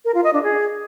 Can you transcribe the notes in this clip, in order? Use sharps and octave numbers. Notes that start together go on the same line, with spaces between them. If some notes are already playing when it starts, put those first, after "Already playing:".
A#4
F4
D#5
D4
G#4